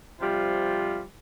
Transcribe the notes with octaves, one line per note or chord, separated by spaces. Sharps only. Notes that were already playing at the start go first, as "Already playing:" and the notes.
C3 F3 G3 F4